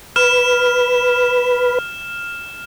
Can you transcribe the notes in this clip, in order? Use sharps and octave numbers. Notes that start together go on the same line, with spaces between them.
B4 F6 E7